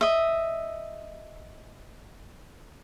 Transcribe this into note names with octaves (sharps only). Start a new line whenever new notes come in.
D#5 E5